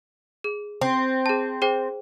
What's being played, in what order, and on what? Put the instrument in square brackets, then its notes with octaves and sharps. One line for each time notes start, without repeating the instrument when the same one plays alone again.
[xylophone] G#4
[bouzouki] C4
[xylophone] G#4 A5
G#4 C5 G5